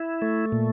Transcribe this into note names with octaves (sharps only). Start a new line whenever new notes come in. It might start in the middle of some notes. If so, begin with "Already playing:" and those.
Already playing: E4
A3
A#2